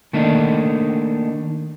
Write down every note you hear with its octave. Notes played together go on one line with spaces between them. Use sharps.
D#3 A3 A#3 D4 D#4